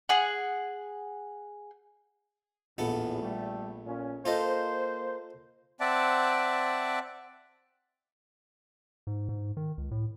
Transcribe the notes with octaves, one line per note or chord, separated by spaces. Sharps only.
G#4 F#5
A#1 E2 A2 B3 A4
G3 A3
A#2 C#4
A#3 F4 A4 C5 D#5
C4 D5 E5 F#5 A5
G#2
G#2
D#3
C#2
A2